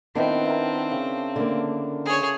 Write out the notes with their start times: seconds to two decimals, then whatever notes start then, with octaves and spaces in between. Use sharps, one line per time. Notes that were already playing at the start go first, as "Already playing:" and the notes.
0.15 D#3 B3 C4 D4 E4
0.46 E4 A#4
0.91 C#3
1.36 D3 A#3
2.06 G#4 C#5